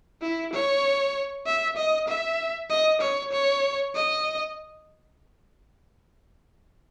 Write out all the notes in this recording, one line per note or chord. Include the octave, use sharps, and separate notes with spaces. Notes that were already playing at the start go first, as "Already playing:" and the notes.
E4
C#5
E5
D#5
E5
D#5
C#5
C#5
D#5